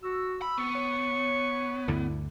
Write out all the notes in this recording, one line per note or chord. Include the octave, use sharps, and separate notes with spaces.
F#4 E6
B5
B3 C#6
C#5
D2 G2 D3 E4